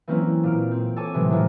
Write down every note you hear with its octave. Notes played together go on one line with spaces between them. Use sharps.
E3 F#3 A#3 C4 C#4 E4
A#2 F6 D7
C4
A4 C#5 G#5 D6
A2 C3 E3 F#3 G#3 A3
A2 D#3 F3 G#3